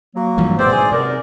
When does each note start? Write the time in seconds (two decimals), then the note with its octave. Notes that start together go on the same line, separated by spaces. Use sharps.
0.15 F#3 A#3
0.38 G2 E3 F3
0.58 E2 G#2 B2 D3 C4 C5 D5
0.72 G#4
0.92 F#2 C3 B3 D#4 A#4 D5